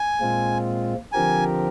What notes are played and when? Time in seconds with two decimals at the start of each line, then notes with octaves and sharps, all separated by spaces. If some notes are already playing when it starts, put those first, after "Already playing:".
Already playing: G#5
0.21 A#2 G#3 C4 F4
1.12 D3 F3 C4 G4 A#4 G#5